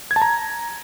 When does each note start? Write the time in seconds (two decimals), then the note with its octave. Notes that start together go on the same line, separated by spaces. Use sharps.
0.11 G#6
0.16 A5
0.22 A#5